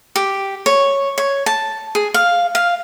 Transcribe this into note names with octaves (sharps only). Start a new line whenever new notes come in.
G4
C#5
C#5
A5
G#4
F5
F5